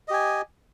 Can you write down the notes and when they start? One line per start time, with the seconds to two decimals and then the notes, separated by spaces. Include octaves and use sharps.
0.08 D#5
0.11 G4
0.13 G#5